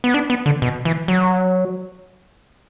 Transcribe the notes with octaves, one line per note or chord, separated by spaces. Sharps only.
B3
D4
B3
D3
B2
E3
F#3